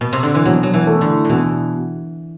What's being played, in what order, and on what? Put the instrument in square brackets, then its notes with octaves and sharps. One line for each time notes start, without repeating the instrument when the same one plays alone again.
[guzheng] B2
C3
D3
E3
[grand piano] B2 [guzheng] F#3
[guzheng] F#3
E3
[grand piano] A3
E4
[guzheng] D3
[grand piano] B2 [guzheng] D3 E3